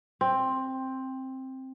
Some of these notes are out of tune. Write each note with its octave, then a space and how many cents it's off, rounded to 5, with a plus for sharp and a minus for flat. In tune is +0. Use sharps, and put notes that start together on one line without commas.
C4 +10